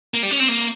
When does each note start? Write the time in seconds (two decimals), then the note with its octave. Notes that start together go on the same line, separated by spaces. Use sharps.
0.14 A#3
0.23 G3
0.31 C#4
0.40 C4
0.48 A#3